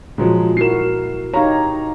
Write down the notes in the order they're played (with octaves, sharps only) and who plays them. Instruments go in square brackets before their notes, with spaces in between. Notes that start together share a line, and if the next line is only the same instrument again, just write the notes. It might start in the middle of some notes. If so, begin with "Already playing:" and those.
[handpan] A#2 [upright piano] F3 F#3 G#3
[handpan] E4 F#4 A#4 [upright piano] C7 E7
[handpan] D#4 G4 C#5 [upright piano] F5 A#5